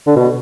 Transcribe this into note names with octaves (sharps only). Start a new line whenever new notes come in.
D3
B2